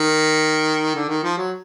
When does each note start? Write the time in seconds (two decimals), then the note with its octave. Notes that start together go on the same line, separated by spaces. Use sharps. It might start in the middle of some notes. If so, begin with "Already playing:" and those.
Already playing: D#3
0.95 D3
1.09 D#3
1.23 F3
1.37 F#3